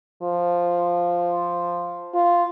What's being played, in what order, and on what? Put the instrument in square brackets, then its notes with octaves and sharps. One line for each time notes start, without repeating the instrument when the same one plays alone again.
[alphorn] F3
F4